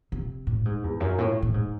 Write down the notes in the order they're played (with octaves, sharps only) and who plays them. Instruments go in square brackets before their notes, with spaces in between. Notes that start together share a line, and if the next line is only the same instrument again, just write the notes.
[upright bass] C3
A2
G#2
E2
F#2
A2
A2
G#2